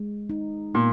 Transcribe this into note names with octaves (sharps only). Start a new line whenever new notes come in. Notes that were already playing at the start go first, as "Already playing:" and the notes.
Already playing: G#3
D#4
A#2 B3